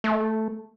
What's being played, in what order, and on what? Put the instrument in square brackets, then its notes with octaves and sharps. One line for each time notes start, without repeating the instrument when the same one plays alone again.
[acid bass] A3